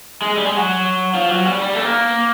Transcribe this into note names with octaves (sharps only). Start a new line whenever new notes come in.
G#3
G3
G#3
F#3
F3
F#3
G3
G3
A3
A#3